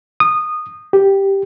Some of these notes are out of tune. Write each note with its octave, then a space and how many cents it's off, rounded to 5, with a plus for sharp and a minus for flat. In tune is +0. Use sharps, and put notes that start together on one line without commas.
D#6 -20
G4 +0